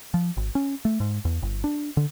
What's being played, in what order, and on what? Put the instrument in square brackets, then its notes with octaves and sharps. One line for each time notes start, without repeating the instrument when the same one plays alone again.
[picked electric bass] F3
G#1
C#4
A3
G#2
E2
G1
D4
D3